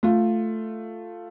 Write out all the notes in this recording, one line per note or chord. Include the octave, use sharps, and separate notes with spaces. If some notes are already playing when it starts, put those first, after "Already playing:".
A3 F4